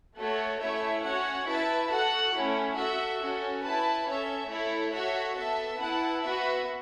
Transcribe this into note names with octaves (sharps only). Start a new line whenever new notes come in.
A3 F#4 A4 C#5
A3 C#4 E4 C#5 E5
C#4 F#4 C#5 F#5
E4 B4 E5 A5
F#4 A4 F#5
A3 C#4 E4
F#4 A4 E5
C#4 F#4 A4
E4 B4 A5
C#4 A4 C#5 E5
A3 E4 A4 C#5
F#4 A4 C#5 E5
B3 A4 E5 A5
E4 B4 F#5 A5
B3 F#4 B4 E5